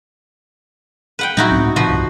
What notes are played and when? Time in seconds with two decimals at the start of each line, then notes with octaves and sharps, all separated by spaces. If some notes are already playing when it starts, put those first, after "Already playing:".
1.19 B4 F#5 G5
1.37 A#2 F#3 D#4 E4 F#4
1.51 C#2 A2 C4
1.76 A#2 C#3 F3 F#4 B4
1.89 C2 G2 C3